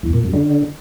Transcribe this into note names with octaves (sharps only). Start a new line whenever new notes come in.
E2
A#2
F#2
D3